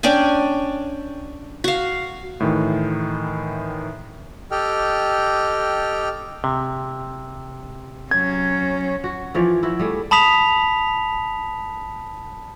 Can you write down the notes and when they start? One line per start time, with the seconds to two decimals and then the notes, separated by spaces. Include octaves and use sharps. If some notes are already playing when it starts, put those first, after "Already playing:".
0.03 C#4 D4 G5 G#5
1.64 F#4 F5
2.40 A2 D#3 E3
4.51 G4 A4 D#5 G5 F6
6.44 C3
8.11 F#3 C#4 G#6
9.04 F#4
9.34 E3 F3 C#5 D5
9.63 E4 F#4
9.79 G3 A3 G#4
10.11 A5 B5 D#6 B6 F7